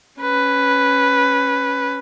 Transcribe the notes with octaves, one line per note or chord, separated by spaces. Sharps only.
C#4 B4